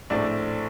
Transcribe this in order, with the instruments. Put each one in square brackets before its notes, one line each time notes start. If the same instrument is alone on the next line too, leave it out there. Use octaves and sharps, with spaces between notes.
[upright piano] A#1 A2 A3 C4 D5